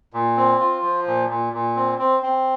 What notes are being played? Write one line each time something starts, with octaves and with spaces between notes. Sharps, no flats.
A#2
C4
F4
F3
A#2
A#2
A#2
C4
C4
C4